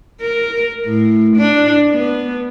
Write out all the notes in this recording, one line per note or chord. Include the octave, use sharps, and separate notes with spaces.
A#4
A2
D4
B3